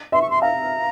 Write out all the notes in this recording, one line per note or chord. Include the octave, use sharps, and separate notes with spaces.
E5 C6
C#6
C6
F5 A#5